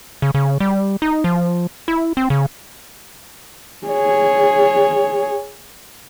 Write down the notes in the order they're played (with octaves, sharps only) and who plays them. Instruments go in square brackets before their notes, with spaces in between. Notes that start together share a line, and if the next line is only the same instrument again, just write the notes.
[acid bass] C#3
C#3
G3
D#4
F3
E4
C4
C#3
[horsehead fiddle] G#4 C#5